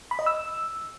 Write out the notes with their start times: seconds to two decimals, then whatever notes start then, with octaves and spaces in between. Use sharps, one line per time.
0.11 B5
0.19 D#5
0.26 E6